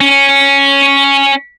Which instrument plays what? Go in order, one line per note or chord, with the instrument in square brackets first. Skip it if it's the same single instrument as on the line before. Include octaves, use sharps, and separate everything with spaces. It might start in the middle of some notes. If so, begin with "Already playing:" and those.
[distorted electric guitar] C#4